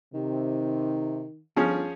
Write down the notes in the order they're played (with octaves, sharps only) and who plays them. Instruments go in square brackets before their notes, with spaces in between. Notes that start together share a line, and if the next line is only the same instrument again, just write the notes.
[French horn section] C3 [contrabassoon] D#3
[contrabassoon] G1 [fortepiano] F3 C#4 G#4